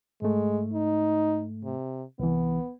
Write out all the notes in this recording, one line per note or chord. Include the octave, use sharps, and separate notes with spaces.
G#2 G#3 A3
D#4
C3
C2 E3 B3